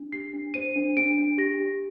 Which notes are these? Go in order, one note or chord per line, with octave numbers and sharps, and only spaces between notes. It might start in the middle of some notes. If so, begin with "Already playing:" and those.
Already playing: D4
G4 C7
D4
C5 D#7
D4
D4 D7
D4
G4 A#6
G4